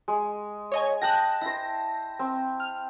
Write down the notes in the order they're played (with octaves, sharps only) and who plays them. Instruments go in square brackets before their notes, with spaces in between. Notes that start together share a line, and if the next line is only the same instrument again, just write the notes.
[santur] G#3
[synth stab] C#5 D#5 G#5
[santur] G5 A5 D#6 [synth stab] F#6 A#6
[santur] E4 C5 [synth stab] A#6
[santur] C4
[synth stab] F6